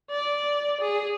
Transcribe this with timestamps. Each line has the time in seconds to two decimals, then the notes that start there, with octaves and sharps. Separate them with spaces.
0.11 D5
0.81 G#4